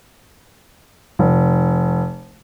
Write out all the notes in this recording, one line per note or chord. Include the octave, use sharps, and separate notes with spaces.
F1